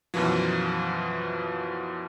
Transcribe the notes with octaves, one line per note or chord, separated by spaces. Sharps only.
F#2 B2 E3 F3